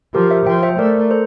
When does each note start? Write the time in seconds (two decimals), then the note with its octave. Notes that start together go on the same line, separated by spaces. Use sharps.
0.14 F3 G4 A#4
0.30 C5 E5
0.46 F3 E5 G5
0.63 C5 E5
0.79 A3 A#4 D5
1.01 A#4
1.11 A4 C5